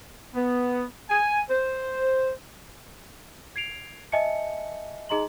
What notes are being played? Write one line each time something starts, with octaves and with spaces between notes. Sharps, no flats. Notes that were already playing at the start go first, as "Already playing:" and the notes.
B3
G#5
C5
G#6 C7 D7 F7
D#5 E5 G#5 A5 C#7
D#4 G#4 D#5 A#5 C6 F#7